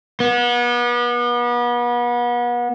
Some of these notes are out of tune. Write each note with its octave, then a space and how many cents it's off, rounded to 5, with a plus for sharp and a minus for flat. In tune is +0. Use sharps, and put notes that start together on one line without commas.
B3 -35